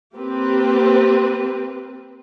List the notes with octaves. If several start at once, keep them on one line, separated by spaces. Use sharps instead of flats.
A#3 C4 G4 B4